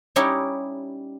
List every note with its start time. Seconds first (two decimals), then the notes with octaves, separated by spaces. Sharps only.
0.16 G3 C#4 D#4 E4 G4 C#5